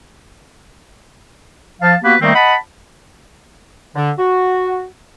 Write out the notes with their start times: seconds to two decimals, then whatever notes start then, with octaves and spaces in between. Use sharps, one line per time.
1.81 F3 F5 A5
2.04 A#3 B3 F#4 G4 B4
2.22 D#3 G3 A3 A#3 C4 D#4
2.35 D#5 F#5 A5 B5
3.96 D3
4.19 F#4